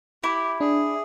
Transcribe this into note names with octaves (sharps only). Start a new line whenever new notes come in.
E4 G4
D4 G#4